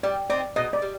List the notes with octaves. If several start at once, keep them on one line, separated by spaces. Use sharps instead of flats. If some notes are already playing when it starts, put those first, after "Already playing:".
G3 D5
C4 D#4 D5
B2 D#5
D5
G3